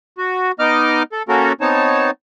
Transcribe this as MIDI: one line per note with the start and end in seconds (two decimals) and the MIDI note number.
0.18 0.52 66
0.59 1.03 59
0.59 1.03 63
0.59 1.03 75
0.59 1.03 86
0.59 1.03 89
1.12 1.23 69
1.29 1.52 58
1.29 1.52 61
1.29 1.52 66
1.29 1.52 69
1.29 1.52 70
1.61 2.11 59
1.61 2.11 60
1.61 2.11 63
1.61 2.11 73
1.61 2.11 81